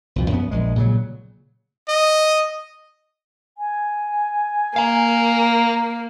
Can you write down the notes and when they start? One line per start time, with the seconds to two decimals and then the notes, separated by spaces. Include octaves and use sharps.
0.16 C2 F2 B2
0.31 F#2 B3
0.51 A#1 G#3
0.76 A#2 C#3 F#3
1.88 D#5
3.58 G#5
4.76 A#3 F5 A#5